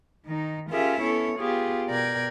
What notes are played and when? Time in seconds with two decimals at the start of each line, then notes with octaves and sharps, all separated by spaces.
0.25 D#3 D#4
0.70 C#4 F4 G4 G#4 A#4 E5
1.01 B3 C#4 E4 A4 C#5
1.38 B3 F4 G4 G#4
1.88 B2 A#4 D5 G5 G#6